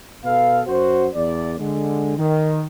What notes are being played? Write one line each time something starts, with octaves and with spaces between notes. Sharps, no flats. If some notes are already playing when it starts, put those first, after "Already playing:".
B2 A4 B4 F5
F#2 F#4 C5
E2 D5
D3 G#3
D#3